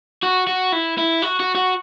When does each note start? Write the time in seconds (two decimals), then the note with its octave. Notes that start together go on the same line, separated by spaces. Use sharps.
0.23 F#4
0.47 F#4
0.73 E4
0.98 E4
1.22 F#4
1.40 F#4
1.55 F#4